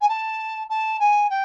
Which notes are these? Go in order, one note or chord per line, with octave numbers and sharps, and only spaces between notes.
G#5
A5
A5
G#5
G5